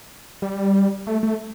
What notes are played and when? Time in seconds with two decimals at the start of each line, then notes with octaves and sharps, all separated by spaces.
0.42 G3
1.07 A3
1.23 A3